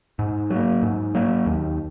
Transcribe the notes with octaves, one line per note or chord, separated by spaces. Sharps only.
G#2
F#3
A#3
G#2
F#3 A#3
D#2